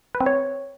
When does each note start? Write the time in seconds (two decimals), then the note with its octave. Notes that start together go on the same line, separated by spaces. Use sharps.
0.15 B4
0.20 C4
0.26 C#5